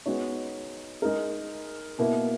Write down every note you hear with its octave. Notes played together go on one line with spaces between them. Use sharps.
G#3 B3 D#4 F#4 C#5
G#3 D#4 A#4
B2 A#3 E4